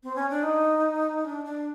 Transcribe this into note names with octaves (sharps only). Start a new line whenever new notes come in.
C4
C#4
D4
D#4
D4
D4